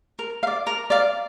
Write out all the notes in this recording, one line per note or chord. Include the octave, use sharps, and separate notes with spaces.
A#4
F5
D5
A#4
D5 F5